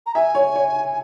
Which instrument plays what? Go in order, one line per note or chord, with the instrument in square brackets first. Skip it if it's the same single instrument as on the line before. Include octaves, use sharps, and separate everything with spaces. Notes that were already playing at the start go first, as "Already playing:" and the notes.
[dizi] A#5
[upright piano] E5 [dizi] G#5
[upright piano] C#5
C#5